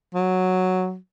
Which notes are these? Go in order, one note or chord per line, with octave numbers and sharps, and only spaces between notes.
F#3